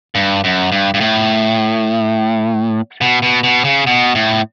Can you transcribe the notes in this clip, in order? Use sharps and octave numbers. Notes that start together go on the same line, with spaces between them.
G2
F#2
G2
G2
A2
B2
B2
B2
C#3
B2
A2